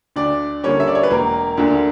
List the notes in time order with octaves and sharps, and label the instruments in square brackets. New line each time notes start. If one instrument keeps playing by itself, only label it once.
[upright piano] D2 D4 D5
D3 G3 A#3 C#4 C#5
E5
D5
C#5
B4
E1 A#3 A#4
D2 D3 A#3